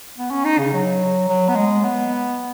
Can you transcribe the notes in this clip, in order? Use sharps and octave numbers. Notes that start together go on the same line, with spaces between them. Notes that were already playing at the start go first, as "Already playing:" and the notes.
B3
C#4
D#4
C#3
F#3
F#3
B3
G#3
B3